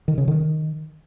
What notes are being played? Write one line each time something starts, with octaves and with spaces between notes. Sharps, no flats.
D#3
C#3
D#3